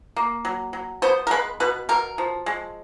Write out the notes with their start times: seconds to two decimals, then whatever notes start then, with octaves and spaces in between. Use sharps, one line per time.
0.17 A#3
0.45 F#3
0.73 F#3
1.02 B3 C5
1.27 A#4
1.31 G#3 B4
1.60 B2 B4
1.89 B2 A#4
2.18 F3
2.46 G#3